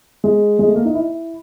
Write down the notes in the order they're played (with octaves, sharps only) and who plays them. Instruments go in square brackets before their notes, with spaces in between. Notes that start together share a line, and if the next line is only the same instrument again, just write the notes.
[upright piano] G#3
G#3
A3
A#3
D#4
E4